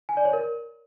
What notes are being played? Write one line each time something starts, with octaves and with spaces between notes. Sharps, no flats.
G#5
D5
C#5
A#4